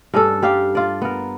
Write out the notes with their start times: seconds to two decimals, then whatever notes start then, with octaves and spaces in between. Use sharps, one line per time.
0.14 G2 C#4 D4 A4
0.42 G3 G4 F5
0.75 F4 D5
1.02 B3 A#4